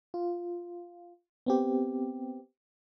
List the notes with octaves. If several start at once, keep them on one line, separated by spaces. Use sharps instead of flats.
F4
B3 C4 G4